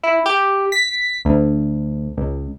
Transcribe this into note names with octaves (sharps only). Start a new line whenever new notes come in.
E4
G4
B6
D2
C#2